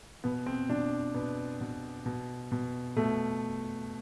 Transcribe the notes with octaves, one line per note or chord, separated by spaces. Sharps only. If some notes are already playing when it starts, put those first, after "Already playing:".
B2 B3
C4
B2 D4
B2 B3
B2
B2
B2
B2 A3